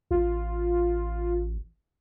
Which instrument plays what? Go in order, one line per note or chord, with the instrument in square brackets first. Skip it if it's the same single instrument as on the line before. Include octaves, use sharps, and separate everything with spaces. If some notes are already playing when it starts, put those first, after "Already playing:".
[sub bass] A1 [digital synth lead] F4